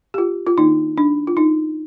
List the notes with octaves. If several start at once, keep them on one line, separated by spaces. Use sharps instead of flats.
G4
F4
F4
D#3 A#3 D4 D#4
D4
F4
D#4